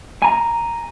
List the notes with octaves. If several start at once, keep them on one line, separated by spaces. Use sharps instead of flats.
G#5 A#5